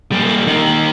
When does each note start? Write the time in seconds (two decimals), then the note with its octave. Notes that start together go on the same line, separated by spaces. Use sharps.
0.12 G3 A#3
0.47 D#3 A#3